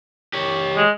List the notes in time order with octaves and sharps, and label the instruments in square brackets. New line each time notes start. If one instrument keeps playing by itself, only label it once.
[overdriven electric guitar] G4 C#5
[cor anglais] G#3